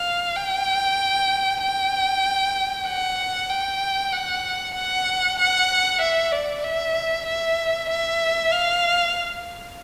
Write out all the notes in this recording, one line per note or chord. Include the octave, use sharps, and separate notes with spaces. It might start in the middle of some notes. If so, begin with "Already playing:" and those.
Already playing: F5
G5
G5
F#5
G5
F#5
F#5
F#5
E5
D5
E5
E5
E5
F5